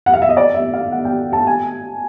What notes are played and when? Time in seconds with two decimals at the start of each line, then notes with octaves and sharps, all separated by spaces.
0.06 F#5
0.13 F5
0.22 E5
0.29 D#5
0.37 D5
0.54 E5
0.73 F5
0.92 F#5
1.05 G5
1.33 A5
1.47 G#5